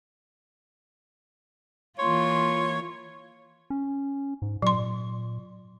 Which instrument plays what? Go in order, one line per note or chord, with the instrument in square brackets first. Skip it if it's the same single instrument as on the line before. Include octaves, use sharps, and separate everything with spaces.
[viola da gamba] E3 A#3 F4 [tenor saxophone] C#5 [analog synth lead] C6
[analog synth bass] C#4
G#2
[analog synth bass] A#2 [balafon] F#3 C6